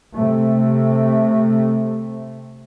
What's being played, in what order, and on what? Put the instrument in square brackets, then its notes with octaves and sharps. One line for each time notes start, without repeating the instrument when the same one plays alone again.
[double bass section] C3 A3